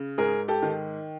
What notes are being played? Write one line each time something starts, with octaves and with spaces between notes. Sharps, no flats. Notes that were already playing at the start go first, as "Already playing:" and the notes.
Already playing: C#3
G#2 G#4 A#4
G4 A4
D#3